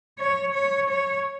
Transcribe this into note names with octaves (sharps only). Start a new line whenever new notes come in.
C#5
C#5
C#5